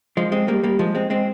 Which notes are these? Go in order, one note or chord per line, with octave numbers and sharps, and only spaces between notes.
F3 G#3
G#3 C4
G3 A#3
G3 A#3
F3 G#3
G#3 C4
G#3 C4